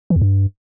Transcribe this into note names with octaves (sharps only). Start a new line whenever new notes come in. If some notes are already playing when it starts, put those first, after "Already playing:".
E3
E2
G2